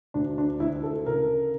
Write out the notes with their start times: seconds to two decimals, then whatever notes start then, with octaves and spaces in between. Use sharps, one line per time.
0.14 D2 D4
0.38 D4
0.60 D2 E4
0.83 A4
1.06 C#3 A#4